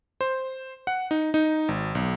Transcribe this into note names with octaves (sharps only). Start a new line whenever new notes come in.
C5
F#5
D#4
D#4
G#1
B1